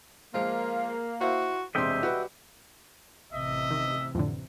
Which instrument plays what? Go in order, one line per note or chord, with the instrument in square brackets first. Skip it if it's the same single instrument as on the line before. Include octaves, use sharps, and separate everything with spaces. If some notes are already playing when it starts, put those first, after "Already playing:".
[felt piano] F3 G#3 [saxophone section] A#3 [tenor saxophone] F4
[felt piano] E4 C5 F5 [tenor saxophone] F#4
[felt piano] E1 C3 C6 [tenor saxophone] G3 [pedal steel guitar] D#5 E5 G5
[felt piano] F#4 B4
[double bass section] A1 C3 E3 [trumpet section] D#5 E5
[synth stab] D#3
F2 A2 D3